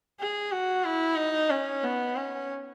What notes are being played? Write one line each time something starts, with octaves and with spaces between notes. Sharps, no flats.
G#4
F#4
E4
D#4
C#4
B3
C#4